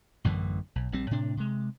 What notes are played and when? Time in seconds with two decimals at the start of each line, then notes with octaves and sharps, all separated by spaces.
0.24 A1 F#2 D3 E3
0.76 B1
0.92 A#1 G3 C4
1.11 A2 C3 D4
1.37 C3 G#3